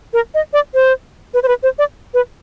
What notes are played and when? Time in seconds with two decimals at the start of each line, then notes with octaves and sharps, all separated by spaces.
0.13 A#4
0.34 D#5
0.53 D5
0.74 C5
1.34 B4
1.43 C5
1.48 B4
1.63 C5
1.79 D5
2.14 B4